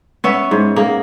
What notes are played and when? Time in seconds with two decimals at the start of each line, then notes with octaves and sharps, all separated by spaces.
0.24 B3 C#4 E5
0.51 G#2
0.76 A#3 G#4